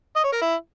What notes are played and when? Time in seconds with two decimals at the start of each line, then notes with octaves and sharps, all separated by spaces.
0.16 D#5
0.24 C#5
0.32 A#4
0.41 E4